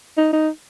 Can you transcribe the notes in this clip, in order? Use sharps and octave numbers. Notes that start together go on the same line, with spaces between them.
D#4
D#4